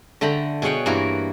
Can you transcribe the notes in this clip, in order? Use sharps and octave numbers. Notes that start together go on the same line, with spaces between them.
D3 A3 G5 A#5 B5
B2 G#4 C#5 F#5 G5
G2 E3 A#3 E4 F#4 A#4